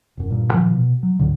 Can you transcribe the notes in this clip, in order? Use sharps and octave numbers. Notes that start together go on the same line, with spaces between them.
E1 F#2
G2 A#2
A#2 D#3 F3
B2
F#3
D2 A2 D3